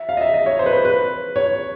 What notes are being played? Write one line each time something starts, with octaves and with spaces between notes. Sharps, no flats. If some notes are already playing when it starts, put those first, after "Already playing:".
Already playing: E5
F5
D#5
E5
D#5
C#5
C5
B4
C5
B4
C#5